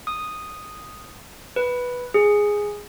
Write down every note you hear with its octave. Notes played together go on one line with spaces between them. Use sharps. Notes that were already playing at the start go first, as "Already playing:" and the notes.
D#6
B4
G#4